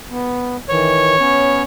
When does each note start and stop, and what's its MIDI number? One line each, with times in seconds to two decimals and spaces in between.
0.10 0.57 59
0.69 1.16 51
0.69 1.16 52
0.69 1.62 73
1.18 1.63 59
1.18 1.63 61